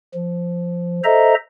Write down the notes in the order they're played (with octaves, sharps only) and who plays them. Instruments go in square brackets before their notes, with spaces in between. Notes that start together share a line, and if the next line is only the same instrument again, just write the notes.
[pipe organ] F3
A4 C5 D#5 E5 A#5